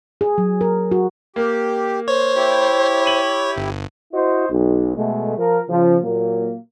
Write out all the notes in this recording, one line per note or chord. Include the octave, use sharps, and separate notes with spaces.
G#4
F#3
A#4
F#4
A#3 G4
C5 C#5
E4 G4
D#7 F#7
G1
E4 F#4 C5 D#5
B1
B2 G#3 A3
F3 A#4
C#3 F3
A#2 F#3 A#3